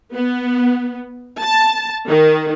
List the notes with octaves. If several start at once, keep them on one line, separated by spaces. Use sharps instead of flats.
B3
A5
D#3